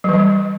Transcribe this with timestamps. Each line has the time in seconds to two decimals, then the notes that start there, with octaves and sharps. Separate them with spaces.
0.04 F#3
0.09 E3
0.13 G3